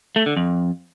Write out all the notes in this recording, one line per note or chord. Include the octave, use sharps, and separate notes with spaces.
A3
D3
F2